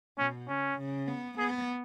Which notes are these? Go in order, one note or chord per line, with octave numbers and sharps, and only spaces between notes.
B2 C#4
C#3 C#4
C#3
B3
B3 G#4